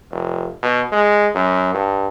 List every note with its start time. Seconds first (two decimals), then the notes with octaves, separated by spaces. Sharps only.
0.11 F1
0.63 B2
0.92 G#3
1.35 F#2
1.74 G2